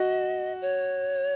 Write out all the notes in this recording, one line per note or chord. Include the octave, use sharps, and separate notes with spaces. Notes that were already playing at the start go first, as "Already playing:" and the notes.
Already playing: F#4 D#5
C#5